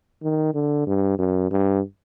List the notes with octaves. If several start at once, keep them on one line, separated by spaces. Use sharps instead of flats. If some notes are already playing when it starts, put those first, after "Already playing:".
D#3
D3
G2
F#2
G2